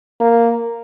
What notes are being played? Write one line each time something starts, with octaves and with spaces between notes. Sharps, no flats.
A#3